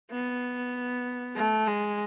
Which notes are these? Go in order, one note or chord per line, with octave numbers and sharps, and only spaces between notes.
B3
A3
G#3